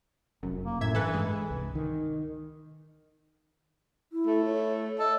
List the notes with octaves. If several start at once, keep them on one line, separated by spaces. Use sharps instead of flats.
F1 B1 F#2
A#3
F#2 A2 E5 G#6
G2 E3 D4 A4 B4
G#3
C2
D#3
E4
A3
C#5
A4 D#5